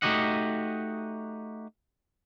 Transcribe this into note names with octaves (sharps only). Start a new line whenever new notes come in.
A3 D#4 F#4 G4 D#5 F#5